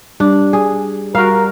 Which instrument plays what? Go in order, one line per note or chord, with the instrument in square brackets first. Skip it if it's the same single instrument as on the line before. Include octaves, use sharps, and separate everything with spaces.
[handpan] G3 [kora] D4
[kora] G#4
[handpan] G3 [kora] F#4 F5 [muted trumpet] A#4